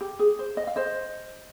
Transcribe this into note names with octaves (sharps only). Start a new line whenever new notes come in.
G4
G#4
C5
D#5
F5
C5 D#5